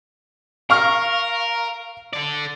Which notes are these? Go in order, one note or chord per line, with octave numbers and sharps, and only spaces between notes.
A#4 F5 C#6 F6
A4 D5